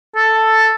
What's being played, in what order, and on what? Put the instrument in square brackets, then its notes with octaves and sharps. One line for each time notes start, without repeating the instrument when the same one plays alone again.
[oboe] A4